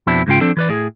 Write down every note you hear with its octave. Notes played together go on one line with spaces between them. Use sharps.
F2 B2 C4 D4 E4
C#2 G#2 C#3 F4 G5
F3 C4 D4 A4
E3 B4 D5
A2 G#4